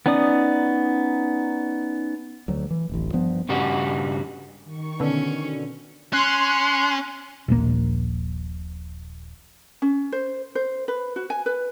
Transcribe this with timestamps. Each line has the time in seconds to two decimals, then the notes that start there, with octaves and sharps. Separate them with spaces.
0.06 B3 C#4 D#4 D5 D#6
2.48 D2 F#3
2.70 E3
2.89 D1 A1
3.13 G2 F3 B3
3.49 G2 C#3 G3 F#4
4.64 D#3 C#6
5.00 B2 D3 C#4
6.13 C#4 C6 F#6
7.48 D#1 A#1 A#3
9.82 C#4
10.12 C5
10.55 C5
10.88 B4
11.16 F#4
11.30 G#5
11.46 B4